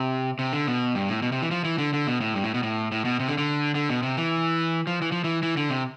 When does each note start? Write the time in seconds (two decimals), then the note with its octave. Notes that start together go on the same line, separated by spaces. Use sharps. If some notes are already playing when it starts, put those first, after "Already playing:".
Already playing: C3
0.39 C3
0.53 D3
0.67 B2
0.95 G2
1.08 A2
1.22 B2
1.32 C3
1.42 E3
1.51 F3
1.65 E3
1.78 D3
1.93 D3
2.07 B2
2.21 A2
2.34 G2
2.44 A2
2.54 B2
2.63 A2
2.92 A2
3.05 B2
3.20 C3
3.28 D3
3.38 D3
3.75 D3
3.89 B2
4.03 C3
4.17 E3
4.87 F3
5.02 E3
5.12 F3
5.24 E3
5.43 E3
5.57 D3
5.70 C3